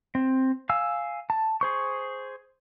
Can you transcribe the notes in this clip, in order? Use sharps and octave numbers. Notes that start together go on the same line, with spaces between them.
C4
F5 G#5 E6
A5
G#4 C5 C#6